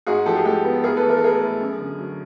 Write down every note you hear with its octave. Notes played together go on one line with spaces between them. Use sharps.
G#2 F#4 G#4
F3 G4 A4
G#4
G#3 G4 A4
B3
A2 G#4 A#4
A4 B4
E3
A#4
A4
A3 G#4 A#4
A2
F#2
D3
F#3